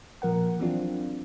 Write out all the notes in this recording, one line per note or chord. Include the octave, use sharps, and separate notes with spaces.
A#2 F3 A#4 F#5
E3 F#3 C4 D4 F4